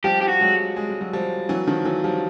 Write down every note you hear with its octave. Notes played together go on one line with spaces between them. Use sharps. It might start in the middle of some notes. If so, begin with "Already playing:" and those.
F3 G3 G4
G4
F#4
F#3 G#3
G#3
G3
F#3
F3 G3
E3 F#3
D#3 F3
E3 F#3
F3 G3